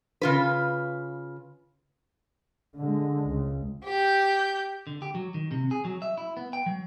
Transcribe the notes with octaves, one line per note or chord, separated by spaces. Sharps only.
C#3 F4 B4
D3 G#3
C#2
G4 G6
D3
G4
F#3
D#3
C3
G#4
F#3
E5
E4
B3
G5
F#3